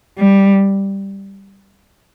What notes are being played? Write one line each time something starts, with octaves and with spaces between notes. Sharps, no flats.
G3